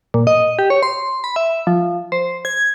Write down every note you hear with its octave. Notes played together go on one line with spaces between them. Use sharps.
A#2
D#5
G4
C#5
C6
B5
E5
F3
C5
G#6